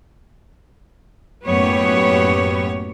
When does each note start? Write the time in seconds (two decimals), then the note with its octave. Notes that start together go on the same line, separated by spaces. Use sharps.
1.47 F#2 A2 A#3 B3 G4 C#5